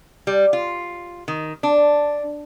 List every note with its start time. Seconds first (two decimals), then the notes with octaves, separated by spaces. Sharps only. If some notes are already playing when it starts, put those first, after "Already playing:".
0.27 G3
0.53 F4
1.28 D#3
1.63 D4